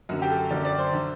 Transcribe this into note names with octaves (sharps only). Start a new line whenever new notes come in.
F#2 D3 F#4
G4
A4
F#2 D3 D5
D5
C5
D3